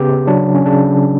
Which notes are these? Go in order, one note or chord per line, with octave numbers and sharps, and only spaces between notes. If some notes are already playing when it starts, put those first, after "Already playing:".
Already playing: C#3 B3 G4 B4
F#3 D4
C#4
C#3 D4